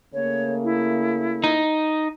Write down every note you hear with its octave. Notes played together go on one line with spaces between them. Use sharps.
C#3 A3 A#3 C#5
E4
D#4